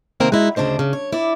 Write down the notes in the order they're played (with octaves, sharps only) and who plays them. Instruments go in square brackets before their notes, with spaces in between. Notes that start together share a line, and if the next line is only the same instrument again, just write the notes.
[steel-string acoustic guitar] C3 D#3 A#3 C4 A#4 A#5
G#3 D#4 E4 F#4
D2 C#3 A#3 D4 C5 D#5
C#3
C#5
E4 D5